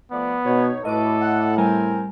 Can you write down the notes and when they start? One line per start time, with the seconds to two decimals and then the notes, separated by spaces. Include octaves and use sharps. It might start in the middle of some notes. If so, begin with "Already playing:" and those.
0.12 F3 A3 B3 D5
0.45 B2 D#4 B4 C#5
0.85 A2 F#4 A4 B4 D#5 D6
1.21 F#5
1.58 G3 C4 A#4 C5 G#5